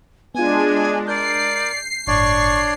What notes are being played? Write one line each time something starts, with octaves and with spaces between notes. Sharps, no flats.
G#3 B3 D4 F4 G#5
A#4 D5 G6 C7
G1 A2 D4 C#5 D5 C#6